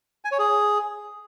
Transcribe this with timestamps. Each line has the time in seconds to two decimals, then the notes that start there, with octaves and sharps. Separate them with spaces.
0.25 G#5
0.32 C#5
0.39 G#4